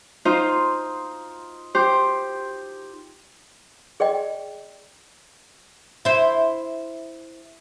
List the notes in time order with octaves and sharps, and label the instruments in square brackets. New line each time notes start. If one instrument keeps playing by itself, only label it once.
[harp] D#4 F4 C5
G4 C5
[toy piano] G#4 D5 D#5 G5
[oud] E4 C5